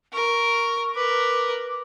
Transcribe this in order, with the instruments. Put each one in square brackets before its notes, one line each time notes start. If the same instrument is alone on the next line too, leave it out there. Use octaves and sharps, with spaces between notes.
[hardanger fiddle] A#4 [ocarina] C#6
[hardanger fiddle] A#4 B4 [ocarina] D6